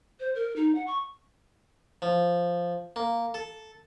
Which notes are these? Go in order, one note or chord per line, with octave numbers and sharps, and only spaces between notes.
C5
A#4
D#4
F#5
C#6
F3
A#3
A4